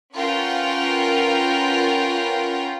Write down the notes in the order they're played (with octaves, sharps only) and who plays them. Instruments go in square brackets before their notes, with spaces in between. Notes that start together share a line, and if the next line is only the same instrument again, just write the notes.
[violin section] C#4 F4 A#4 B4 F#5 G5